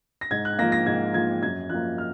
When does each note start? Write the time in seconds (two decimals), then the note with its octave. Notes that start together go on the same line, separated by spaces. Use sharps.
0.21 A#6
0.31 G#2 G#6
0.45 F#6
0.58 A#3 A#6
0.62 F3
0.72 A#6
0.86 G#2 G#6
1.14 F3 A#3 G#6
1.42 F#2 G#6
1.69 F3 A#3 F#6
1.98 F6